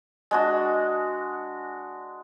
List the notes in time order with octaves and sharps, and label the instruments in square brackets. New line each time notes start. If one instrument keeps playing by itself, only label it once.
[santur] G#3 D4 F#4